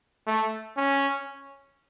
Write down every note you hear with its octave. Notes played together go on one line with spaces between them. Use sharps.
A3
C#4